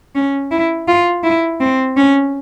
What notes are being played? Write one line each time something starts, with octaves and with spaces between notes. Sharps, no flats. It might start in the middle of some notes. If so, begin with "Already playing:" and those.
C#4
E4
F4
E4
C4
C#4